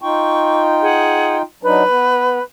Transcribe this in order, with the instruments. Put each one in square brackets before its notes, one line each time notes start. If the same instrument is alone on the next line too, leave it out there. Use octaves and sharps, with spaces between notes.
[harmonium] D#4 F4 G5 [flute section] C#6
[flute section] G#4 F#5
[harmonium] F#3 D4 D#4 [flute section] B4
[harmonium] B3